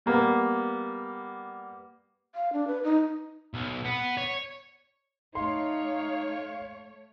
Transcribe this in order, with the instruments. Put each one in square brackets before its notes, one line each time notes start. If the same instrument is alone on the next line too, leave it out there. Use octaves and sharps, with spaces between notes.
[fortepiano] G3 A#3 B3
[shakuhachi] F5
D4
B4
D#4
[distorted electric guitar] B1
B3
C#5
[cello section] A3 C#5 [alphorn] D#4 [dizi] F5 [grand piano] C6